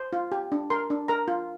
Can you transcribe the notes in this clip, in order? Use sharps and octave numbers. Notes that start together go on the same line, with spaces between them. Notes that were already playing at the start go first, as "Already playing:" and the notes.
Already playing: C5
F4
G4
D4
A#4 C6
D4
A#4 A#5
F4